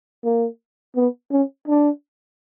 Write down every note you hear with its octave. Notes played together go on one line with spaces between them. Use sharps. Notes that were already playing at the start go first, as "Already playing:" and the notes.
A#3
B3
C#4
D4